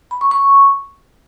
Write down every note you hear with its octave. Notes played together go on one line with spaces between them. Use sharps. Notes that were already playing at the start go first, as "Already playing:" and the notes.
B5
C#6
C#6